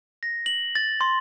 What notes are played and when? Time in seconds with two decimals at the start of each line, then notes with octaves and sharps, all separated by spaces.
0.23 A#6
0.46 F#7
0.75 A6
1.01 C6